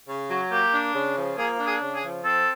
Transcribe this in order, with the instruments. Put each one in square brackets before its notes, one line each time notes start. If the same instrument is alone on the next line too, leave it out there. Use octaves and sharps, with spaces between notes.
[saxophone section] C#3
F#3
[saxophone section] A#3 [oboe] G4
[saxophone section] D4
C#3
F3
[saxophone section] A#3 [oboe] G#4
[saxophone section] D4
[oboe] G#4
[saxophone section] C#3
[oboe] G#4
[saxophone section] F3
[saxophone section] C4 [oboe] A4